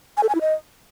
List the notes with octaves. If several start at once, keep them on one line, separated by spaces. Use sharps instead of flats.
G#5
A4
G#5
E4
D#5